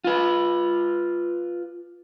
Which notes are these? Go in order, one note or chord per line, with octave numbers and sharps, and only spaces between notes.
F4 B4